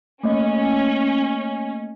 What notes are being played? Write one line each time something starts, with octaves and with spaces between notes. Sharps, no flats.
A3 A#3 C#4 D#5